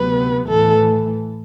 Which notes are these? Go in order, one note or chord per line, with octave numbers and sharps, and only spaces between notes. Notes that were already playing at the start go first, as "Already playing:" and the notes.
Already playing: D2 C3 F#3 B3 B4
A2 E3 A3 A4